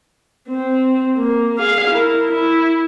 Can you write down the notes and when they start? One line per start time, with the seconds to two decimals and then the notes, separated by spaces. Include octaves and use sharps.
0.49 C4
1.18 A#3
1.58 G#4 F5
1.90 E4 A#4
2.30 E4